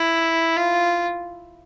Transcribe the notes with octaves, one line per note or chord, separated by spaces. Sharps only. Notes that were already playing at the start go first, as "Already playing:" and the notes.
Already playing: E4
F4